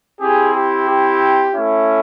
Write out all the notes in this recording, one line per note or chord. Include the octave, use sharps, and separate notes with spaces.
C4 E4 G4 G#4
G4
G4
A3 C#4 E4